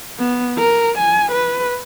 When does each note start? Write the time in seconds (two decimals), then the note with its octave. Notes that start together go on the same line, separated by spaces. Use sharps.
0.19 B3
0.58 A#4
0.98 G#5
1.32 B4